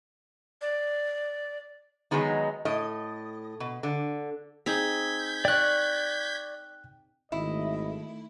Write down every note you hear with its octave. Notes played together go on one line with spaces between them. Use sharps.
D5
D#3 F#3 G#3 B3 D#4
A2 D#5
B2
D3
C4 D#4 G#4 G6 G#6 B6
D5 G5 C#6 F#6
G#1 D#3 A3 E4 D#5